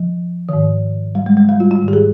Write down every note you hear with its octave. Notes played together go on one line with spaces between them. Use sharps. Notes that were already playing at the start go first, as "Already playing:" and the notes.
Already playing: F3
G#2 D#3
G3
G#3
G#3
G3
F4
F4
G#2 D#3
G4
G#4